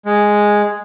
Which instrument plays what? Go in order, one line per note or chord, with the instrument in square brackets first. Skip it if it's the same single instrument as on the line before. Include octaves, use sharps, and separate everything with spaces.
[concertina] G#3